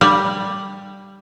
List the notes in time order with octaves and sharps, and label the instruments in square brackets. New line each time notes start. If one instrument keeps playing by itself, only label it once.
[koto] G3